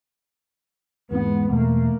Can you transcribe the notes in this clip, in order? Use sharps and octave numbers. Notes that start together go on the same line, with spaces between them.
E2 G#2 G#3 B3
E1 A3 A#3